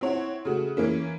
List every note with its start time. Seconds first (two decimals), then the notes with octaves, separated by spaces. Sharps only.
0.01 C4 E4 C#5 F#5
0.45 C#3 A3 F#4
0.77 E3 A#3 C#4